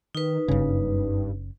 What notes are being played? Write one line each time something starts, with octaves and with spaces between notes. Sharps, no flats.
D#3 D#4 B4
F#1 G2 C#3